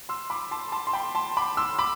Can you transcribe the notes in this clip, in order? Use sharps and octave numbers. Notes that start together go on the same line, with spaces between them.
C6 E6
B5 D6
A5 C6
A5 C6
C6
G5 B5
A5 C6
B5 D6
C6 E6
B5 D6